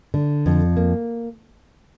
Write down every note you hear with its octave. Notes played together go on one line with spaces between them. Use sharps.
D3
F2
A#3